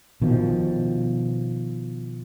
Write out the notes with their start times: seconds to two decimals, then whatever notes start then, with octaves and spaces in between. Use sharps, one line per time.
0.22 B2 D#3 F3